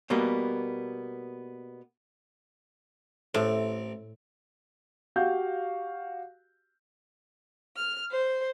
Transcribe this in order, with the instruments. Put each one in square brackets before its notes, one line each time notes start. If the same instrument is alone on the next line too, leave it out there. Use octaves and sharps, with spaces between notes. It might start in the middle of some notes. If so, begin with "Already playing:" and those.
[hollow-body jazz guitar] B2 G3 A#3 B3
[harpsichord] A1 C4 [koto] A2
[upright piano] F#4 G4 F5 G6
[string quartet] F6
C5